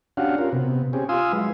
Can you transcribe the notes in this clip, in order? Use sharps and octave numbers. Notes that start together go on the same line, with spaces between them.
C#4 D4 F#4 G4 F5 F#5
C#4 F4 A#4
C3 B3
C4 C#4 G4 G#4
F4 F5 G#5 C6 D#6 E6
F#3 G#3 E4 B4